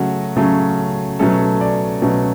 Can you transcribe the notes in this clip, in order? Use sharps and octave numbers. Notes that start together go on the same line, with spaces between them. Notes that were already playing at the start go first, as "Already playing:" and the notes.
Already playing: C#3 F#3 A3 C#4 F#4
C#3 F#3 A3 C#4
B2 F#3 A3 C#4 A4
D5
B2 F#3 A3 C#4